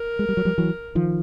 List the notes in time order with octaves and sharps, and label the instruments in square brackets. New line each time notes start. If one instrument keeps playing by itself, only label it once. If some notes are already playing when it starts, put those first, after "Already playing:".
Already playing: [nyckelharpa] A#4
[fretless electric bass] G#3
G3
F#3
F3 G3
E3 F#3
D#3 F3